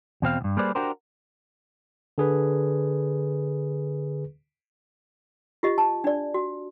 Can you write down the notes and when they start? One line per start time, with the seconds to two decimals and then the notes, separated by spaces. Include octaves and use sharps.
0.22 E2 B2 C4 F5
0.41 D2 G2
0.57 G3 A#3 G#4 B4 C5 D5
0.75 D4 F#4 G4 A#4 C5
2.18 D3 G#4 B4
5.63 F4 G4 D#5
5.78 A5
6.04 D4 D5
6.34 F#4